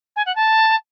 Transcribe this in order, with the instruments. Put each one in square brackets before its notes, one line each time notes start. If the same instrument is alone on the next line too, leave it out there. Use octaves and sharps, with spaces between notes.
[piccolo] G#5
F#5
A5